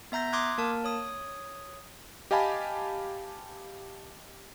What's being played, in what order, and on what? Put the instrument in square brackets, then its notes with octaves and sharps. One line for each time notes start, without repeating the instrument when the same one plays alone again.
[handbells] B3 E5 A#5 G6 A#6
C6 D6 D#6 F#6 G#6
A#3 A#4 A5
C#5 D#6
[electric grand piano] G4 D#5 F5 G#5 A5 B5